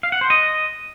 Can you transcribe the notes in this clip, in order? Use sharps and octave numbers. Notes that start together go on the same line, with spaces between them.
F5
F#5
C5
D#5